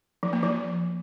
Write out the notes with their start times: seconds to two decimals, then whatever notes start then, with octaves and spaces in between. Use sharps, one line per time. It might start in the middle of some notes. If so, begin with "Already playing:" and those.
0.23 F3
0.33 A#3
0.43 F3